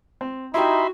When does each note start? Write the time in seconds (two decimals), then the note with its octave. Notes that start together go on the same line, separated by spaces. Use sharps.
0.21 C4
0.54 D#4 E4 F#4 G4 E5 B5 C6